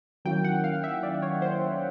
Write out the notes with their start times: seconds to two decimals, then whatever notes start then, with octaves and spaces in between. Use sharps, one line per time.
0.25 D#3 F#3 A#3 C#4 E4 G5
0.44 F#5
0.64 F5
0.84 E5
1.03 D5
1.22 C#5
1.42 C5